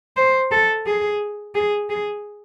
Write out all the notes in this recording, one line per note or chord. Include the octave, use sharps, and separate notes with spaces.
C5
A4
G#4
G#4
G#4